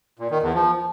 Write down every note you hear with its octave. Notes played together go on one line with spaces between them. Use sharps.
A#2
D#3
E2
F3